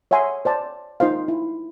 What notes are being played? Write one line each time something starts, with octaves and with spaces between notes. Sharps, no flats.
C#5 E5 F#5 G#5 C6
C5 D5 A5
D#4 F4 C5 F5
E4